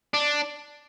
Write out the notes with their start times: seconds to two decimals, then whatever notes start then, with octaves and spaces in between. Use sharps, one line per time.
0.14 D4